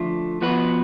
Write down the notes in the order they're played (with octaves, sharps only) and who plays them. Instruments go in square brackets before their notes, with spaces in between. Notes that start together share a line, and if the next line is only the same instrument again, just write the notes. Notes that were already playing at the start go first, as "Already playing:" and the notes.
Already playing: [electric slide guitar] D3 F3 A3 F4
F3 B3 F#4 B4